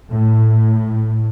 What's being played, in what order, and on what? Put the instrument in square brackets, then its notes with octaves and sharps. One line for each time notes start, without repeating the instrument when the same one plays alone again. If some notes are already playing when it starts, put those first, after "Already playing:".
[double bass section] A2